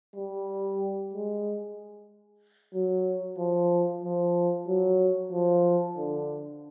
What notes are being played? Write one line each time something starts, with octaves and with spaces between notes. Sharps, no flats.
G3
G#3
F#3
F3
F3
F#3
F3
D3